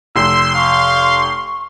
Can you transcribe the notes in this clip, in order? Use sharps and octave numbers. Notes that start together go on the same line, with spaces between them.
F1 C6 E6
F5 C#6